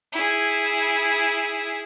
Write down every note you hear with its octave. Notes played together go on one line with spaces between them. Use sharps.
E4 G#4